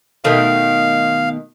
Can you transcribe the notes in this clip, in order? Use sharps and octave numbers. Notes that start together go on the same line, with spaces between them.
B2 D#3 A3 F5